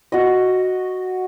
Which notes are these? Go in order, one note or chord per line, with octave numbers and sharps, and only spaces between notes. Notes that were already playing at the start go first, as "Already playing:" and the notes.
F#4 D#5